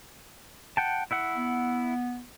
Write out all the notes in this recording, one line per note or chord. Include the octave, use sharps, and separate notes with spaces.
F#5 G5 A5
E4 E5 F#5
B3